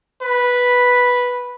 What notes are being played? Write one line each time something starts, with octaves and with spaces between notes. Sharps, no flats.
B4